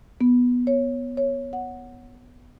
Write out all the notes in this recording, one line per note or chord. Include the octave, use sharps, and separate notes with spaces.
B3
C#5
C#5
F#5